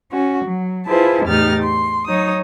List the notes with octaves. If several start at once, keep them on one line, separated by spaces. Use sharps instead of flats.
C#4 F#4
F#3
E4 F4 G#4 B4 C5 A5
E2 A2 D#4 G4 F6 A6
C6
F#3 D#4 C#5 D#6